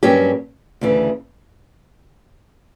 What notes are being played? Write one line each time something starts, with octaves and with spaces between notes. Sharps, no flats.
G2 F#3 A#3 C#4 G4
D2 C#3 E3